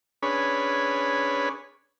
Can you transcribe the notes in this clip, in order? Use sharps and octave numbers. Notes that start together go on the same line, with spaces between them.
C#4 D4 G#4 B4 C#5 B5